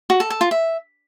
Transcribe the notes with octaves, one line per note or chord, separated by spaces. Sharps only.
F#4
A4
A4
F4
E5